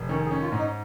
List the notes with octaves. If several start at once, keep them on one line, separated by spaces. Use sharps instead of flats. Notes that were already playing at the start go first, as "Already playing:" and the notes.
Already playing: F1
D#3 C#4 C#5
G#4
C#4
F4
G#2
D#4